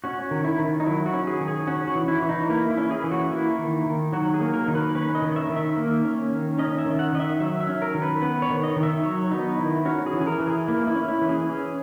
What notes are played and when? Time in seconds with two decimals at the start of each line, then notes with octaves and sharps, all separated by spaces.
0.04 C#4 F#4
0.31 D#3
0.44 E4
0.59 D#3
0.80 D#4
0.86 F#3 E4
1.06 F#4
1.14 C#4
1.27 G#4
1.41 D#3
1.48 G#4
1.67 C#4 F#4
1.88 F#4
1.95 E3
2.08 E4
2.22 E3
2.29 D#4
2.49 A#3 E4
2.71 E4
2.77 C#4
2.91 G#4
3.04 E3
3.11 F#4
3.31 A#3 E4
3.58 D#3
3.86 D#3
4.12 F#3 F#4
4.34 G#4
4.41 A#3
4.53 A#4
4.68 D#3
4.75 B4
4.95 C#4 B4
5.15 D#5
5.22 D#3
5.36 E5
5.49 D#3
5.56 E5
5.77 A#3
6.05 C#4
6.32 D#3
6.59 C#4 D#5
6.79 E5
6.86 D#3
6.99 F#5
7.13 D#3 D#5
7.20 E5
7.40 F#3 E5
7.61 E5
7.67 C#4
7.82 A#4
7.94 D#3
8.02 B4
8.22 B3 B4
8.42 C#5
8.50 D#3
8.63 D#5
8.76 D#3
8.83 E5
9.04 F#3 C#5
9.31 B3 D#4
9.58 D#3 E4
9.85 C#4 F#4
10.06 G#4
10.13 E3
10.21 G#4
10.27 A#4
10.40 E3
10.47 G#4
10.68 A#3 E4
10.87 E4
10.95 C#4
11.08 E4
11.22 E3
11.29 G#4
11.50 C#4 G#4